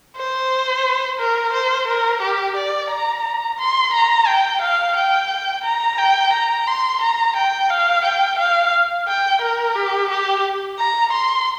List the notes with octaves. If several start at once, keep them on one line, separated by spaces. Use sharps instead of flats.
C5
A#4
C5
A#4
G4
D5
A#5
C6
A#5
G5
F5
G5
A#5
G5
A#5
C6
A#5
G5
F5
G5
F5
G5
A#4
G4
G4
A#5
C6